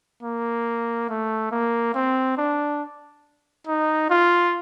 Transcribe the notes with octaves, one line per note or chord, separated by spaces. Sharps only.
A#3
A3
A#3
C4
D4
D#4
F4